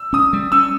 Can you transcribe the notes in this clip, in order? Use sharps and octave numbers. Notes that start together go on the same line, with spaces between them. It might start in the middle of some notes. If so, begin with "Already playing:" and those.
Already playing: E6
C#4 D#6
G3
C#4 E6